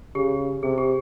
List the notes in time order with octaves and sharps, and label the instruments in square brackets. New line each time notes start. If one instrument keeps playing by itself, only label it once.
[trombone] C#3 [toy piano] G4
[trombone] C3 [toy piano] G#4
[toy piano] G4